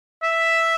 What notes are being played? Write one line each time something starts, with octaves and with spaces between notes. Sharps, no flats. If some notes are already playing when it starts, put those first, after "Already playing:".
E5